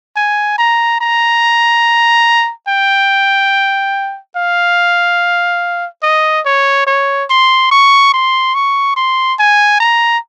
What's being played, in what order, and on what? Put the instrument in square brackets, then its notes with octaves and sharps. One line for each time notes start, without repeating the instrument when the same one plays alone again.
[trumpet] G#5
A#5
A#5
G5
F5
D#5
C#5
C#5
C6
C#6
C6
C#6
C6
G#5
A#5